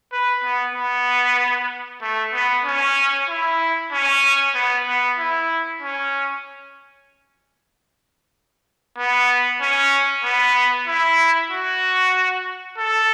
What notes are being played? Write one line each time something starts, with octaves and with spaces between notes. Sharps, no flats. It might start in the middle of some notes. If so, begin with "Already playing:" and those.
B4
B3
B3
A3
B3
C#4
E4
C#4
B3
B3
E4
C#4
B3
C#4
B3
E4
F#4
A4